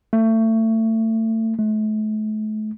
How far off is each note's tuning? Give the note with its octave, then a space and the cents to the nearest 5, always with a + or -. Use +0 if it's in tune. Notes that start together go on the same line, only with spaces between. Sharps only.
A3 +25
A3 -40